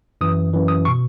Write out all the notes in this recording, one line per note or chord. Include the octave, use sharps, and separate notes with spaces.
F#2 E3 D#6
F#2 E3
D#6
B2 C#6